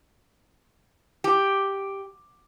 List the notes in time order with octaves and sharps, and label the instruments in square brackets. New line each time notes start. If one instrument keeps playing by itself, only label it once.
[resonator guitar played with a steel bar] G4